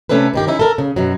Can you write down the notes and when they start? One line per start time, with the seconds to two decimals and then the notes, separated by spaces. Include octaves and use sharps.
0.09 C3 A3 C#4 D4 A4 B4
0.34 G2 D#3 G4
0.47 C#4 D#4 E4
0.59 A4 A#4
0.78 C#3
0.96 F#2 B2 F#3